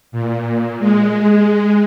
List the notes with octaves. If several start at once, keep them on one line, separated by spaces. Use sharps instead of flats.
A#2
G#3